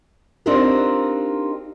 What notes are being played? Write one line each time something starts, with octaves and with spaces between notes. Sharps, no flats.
C4 D4 D#4 F4 G4 A#4